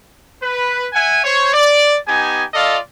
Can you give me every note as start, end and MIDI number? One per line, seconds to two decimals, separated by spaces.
0.42 0.87 71
0.93 1.22 76
0.93 1.22 78
0.93 1.22 80
1.24 1.52 72
1.24 1.52 73
1.54 1.97 74
2.08 2.43 59
2.08 2.43 63
2.08 2.43 67
2.08 2.43 80
2.54 2.78 65
2.54 2.78 69
2.54 2.78 74
2.54 2.78 75
2.54 2.78 77